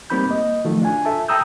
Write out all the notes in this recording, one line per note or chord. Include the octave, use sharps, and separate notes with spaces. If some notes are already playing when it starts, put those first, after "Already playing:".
G3 A#3 C4 D#4 B5 G6
A#3 D#5
D#3 F3 F#3 A3 F4
D4 F4 G#5
A4 E5 A5
G5 A5 A#5 D#6 E6 G6